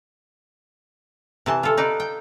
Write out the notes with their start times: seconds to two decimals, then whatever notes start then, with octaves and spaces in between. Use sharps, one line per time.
1.46 C3 E3 A5
1.63 F4 A4
1.77 D#4 B4 D5
2.00 G5